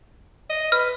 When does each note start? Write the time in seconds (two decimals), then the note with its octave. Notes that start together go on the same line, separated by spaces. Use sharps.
0.50 D#5
0.72 B4 F6